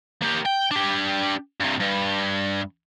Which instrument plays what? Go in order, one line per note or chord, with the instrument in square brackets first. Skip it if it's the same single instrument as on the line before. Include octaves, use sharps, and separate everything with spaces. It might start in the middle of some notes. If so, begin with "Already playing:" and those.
[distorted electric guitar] A#3 G4
G5
D4 G4
G2 C3
G2